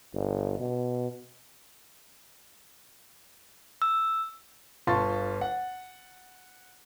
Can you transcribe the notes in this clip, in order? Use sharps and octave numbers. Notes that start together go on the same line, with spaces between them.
G1
B2
E6
G1 F4 A5 C6 C#6 A6
F#5